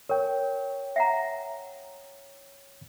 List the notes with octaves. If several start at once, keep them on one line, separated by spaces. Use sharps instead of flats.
A#4 C#5 G5
E5 F#5 A#5